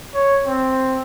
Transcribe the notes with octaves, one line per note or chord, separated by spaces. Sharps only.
C#5
C4